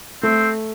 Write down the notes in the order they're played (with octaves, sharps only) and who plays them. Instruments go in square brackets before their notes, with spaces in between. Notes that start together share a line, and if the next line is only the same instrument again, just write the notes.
[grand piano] A3 [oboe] C4